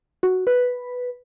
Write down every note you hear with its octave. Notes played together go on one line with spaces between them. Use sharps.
F#4
B4